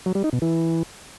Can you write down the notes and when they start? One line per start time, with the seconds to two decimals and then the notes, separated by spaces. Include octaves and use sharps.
0.06 F#3
0.15 G3
0.24 D#4
0.33 B2
0.42 E3